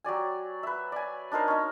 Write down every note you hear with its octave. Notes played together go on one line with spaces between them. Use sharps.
F#3 G4 D5 G#5
B4 E5
D5 G#5
D4 D#4 A#4 C5
C#4 D#4